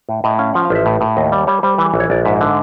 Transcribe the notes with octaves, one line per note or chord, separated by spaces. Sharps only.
A2
A2 D#5
C#4 F5
F3 F#5
F5
A1 E5
A2
A2
D#2 D#5
G3 D5
G3 C#5
G3 C5
E3 B4
A#1
C#5
A#1 D5
G#2 E5
D3